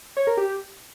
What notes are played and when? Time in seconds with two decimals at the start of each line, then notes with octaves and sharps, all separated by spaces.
0.17 C#5
0.27 A#4
0.37 G4